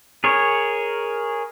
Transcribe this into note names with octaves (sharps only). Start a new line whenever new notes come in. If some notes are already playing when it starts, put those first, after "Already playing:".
G#4 A#4 C#5